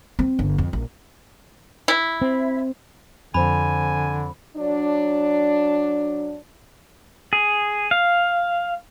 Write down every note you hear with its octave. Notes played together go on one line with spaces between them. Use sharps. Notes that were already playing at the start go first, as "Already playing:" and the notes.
C4
G1
F2
A#1
E4
C4
F2 D3 C5 G#5 B5
F#3 D4
G#4
F5